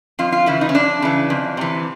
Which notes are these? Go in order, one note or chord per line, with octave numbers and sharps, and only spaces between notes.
F2 F4
F4
C#3 E3 E4
D#4
C#4
F2 D4
C#3 E3
F2
C3 E3